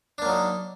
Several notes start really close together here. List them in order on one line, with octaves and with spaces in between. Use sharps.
D4 A#3 F#3 D#4